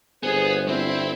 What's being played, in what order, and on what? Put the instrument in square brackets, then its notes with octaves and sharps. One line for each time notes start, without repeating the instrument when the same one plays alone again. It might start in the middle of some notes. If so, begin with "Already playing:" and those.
[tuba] G1 [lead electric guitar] B3 [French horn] G#4 [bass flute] C5
[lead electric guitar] C4 [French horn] E4